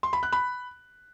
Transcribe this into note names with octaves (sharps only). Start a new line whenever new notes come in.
C6
B5
F#6
B5